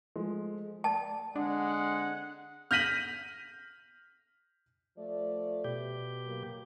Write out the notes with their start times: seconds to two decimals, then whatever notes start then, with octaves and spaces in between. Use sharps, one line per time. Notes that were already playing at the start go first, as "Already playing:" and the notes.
0.16 F3 G#3 A3
0.84 D5 A5
1.36 D3 G#3 C4 D4 F#5
2.71 F6 G6 A#6 B6 D#7 F#7
4.97 F3 A3 D5
5.64 B2 G4
6.26 F#3 A#3